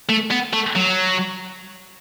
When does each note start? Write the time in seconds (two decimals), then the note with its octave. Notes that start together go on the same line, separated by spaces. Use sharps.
0.09 A3
0.31 B3
0.53 A3
0.75 F#3